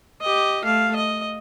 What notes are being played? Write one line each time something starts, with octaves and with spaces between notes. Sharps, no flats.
G4 D#5
A3 F5
D#5